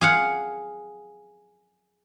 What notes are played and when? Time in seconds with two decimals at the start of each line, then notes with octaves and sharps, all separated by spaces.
0.01 G#4 F5 F#5